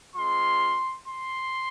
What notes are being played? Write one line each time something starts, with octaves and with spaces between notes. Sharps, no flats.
G#3 C4 F4 C6
C6